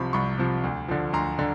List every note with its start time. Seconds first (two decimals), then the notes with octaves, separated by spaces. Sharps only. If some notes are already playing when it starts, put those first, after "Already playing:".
Already playing: C2 C3 F3 B5 C#6
0.13 C2 B5 C#6
0.38 C3 F3
0.64 D2
0.88 D3 F3
1.13 D2 A#5 C6
1.39 D3